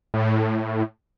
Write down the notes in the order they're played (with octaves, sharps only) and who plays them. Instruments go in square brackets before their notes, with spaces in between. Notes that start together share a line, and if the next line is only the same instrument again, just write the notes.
[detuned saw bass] A2